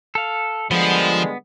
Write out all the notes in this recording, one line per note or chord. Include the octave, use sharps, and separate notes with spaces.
A4 F5
D3 F3 G3 G#3 B3